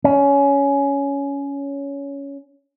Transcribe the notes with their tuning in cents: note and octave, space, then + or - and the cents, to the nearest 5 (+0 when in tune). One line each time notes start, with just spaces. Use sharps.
C#4 +15